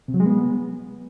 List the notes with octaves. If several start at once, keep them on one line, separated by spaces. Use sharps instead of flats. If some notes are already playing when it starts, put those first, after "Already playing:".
C3
F#3
G#3
B3